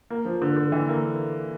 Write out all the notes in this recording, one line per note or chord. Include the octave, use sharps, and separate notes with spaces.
A#3
F3
D3
D3
E3
A#3